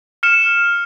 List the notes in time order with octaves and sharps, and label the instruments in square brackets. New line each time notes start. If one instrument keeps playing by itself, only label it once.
[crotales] F6 C#7 E7